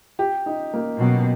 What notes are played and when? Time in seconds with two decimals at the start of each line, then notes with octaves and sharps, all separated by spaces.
0.19 G4
0.46 D#4
0.73 A#3
1.00 B2 F#3